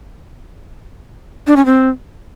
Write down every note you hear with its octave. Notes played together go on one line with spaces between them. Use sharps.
D4
C#4
C4